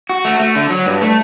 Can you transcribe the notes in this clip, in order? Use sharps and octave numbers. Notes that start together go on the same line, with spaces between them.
F#4
A3
A3
D3
F#3
G2
A3